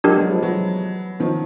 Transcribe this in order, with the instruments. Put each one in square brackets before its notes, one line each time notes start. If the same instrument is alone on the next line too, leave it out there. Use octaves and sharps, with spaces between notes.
[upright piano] F#3 G#3 [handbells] D4 G4 A#4
[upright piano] F#3 G#3
F3 G3
E3 F#3
D#3 F3